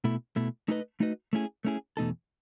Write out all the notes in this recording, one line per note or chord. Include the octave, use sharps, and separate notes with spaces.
B2 A3 E4
B2 A3 E4
A3 D#4 F#4 B4 D#5
A3 D#4 F#4 B4 D#5
A3 C#4 E4 G#4
A3 C#4 E4 G#4
E2 B2 A3 D#4 A4